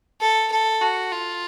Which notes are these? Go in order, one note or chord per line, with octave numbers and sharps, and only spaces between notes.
A4
A4
F#4
F4